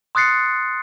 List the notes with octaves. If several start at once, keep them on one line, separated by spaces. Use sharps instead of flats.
C6 D#6 F#6 A6 C7 C#7